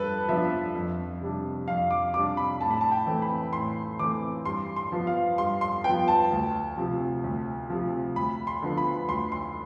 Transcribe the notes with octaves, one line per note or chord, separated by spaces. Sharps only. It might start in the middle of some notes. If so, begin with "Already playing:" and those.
Already playing: G2 F3 A4 B4
F3 B3 D4 E5
F2
C3 G3 D4
F2 F5
D6
C3 G3 D4 D6
B5
A2 A5
B5
A5
G5
E3 A3 C4
B5
A2 C6
E3 A3 C4 D6
G2 C6
C6
F3 B3
F5
G2 C6
C6
F3 B3 G5
A5
D2
C3 F3
D2
C3 F3
D2 B5
C6
D3 F3 B3
B5
D2 C6
C6